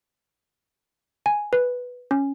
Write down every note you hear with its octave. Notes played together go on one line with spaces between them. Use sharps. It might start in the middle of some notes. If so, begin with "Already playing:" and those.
G#5
B4
C#4